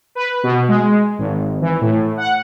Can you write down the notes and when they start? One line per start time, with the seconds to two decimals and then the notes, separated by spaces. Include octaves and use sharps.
0.15 B4
0.43 B2
0.69 G#3
1.19 G#1
1.61 E3
1.81 A2
2.17 F#5